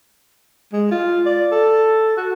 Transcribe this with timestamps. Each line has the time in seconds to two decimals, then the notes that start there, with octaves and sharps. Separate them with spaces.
0.73 G#3
0.91 F4
1.26 D5
1.52 A4
2.17 F#4